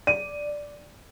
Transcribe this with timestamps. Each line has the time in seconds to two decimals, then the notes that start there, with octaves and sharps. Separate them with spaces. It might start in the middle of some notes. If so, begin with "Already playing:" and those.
0.07 D5 D#7